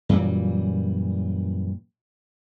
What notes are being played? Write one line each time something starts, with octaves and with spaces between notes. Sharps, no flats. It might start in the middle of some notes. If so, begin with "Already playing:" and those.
F#2 A#2 E3 G3